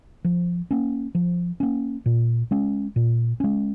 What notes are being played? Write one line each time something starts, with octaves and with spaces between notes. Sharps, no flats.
F3
A#3 C#4
F3
A#3 C#4
A#2
G#3 C#4
A#2
G#3 C#4